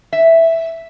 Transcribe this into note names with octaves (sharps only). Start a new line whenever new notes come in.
E5